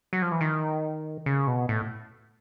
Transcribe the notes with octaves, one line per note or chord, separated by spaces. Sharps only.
F#3
F3
E3
D#3
C#3
B2
A2